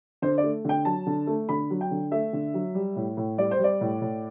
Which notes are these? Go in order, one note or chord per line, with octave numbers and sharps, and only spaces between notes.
D3 C5
D5
A3
D3 G5
F#3 A5
D3
A3
D3 B5
F#3
G5
D3
A3 E5
D3
F#3
G3
A2
A2
G3 D5
C5
G3
D5
A2
A2